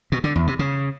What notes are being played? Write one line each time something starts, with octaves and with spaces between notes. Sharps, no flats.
B2
D3
E2
C3
C#3